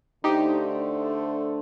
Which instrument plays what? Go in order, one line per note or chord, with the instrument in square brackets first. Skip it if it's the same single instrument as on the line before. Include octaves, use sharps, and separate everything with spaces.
[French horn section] D3 A3 D4 A4 C5 [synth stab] D#4 G4